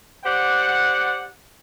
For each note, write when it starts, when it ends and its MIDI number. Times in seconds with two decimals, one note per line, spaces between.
0.25 1.25 67
0.25 1.25 72
0.25 1.25 74
0.25 1.25 78